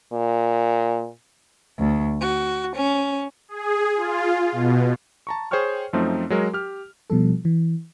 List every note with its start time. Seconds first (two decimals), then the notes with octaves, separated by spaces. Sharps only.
0.13 A#2
1.79 D2
2.19 F#4
2.75 C#4
3.48 G#4
3.96 F4
4.52 B2
5.27 A5 A#5 C#6
5.51 G#4 C5 C#5 G5 C#6 F6
5.93 F#2 F3 A3 C4 D#4
6.30 F#3 G#3 A#4
6.53 G4 F6
7.10 B2 F3 G3 A4
7.45 E3